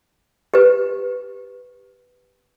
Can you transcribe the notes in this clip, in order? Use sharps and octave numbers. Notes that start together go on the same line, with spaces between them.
G4 B4